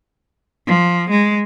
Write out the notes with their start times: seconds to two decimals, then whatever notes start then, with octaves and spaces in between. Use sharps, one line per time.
0.67 F3
1.10 G#3